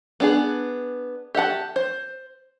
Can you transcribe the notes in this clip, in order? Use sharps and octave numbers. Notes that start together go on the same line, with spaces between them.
B3 D4 G#4
G4 E5 F#5 A5
C5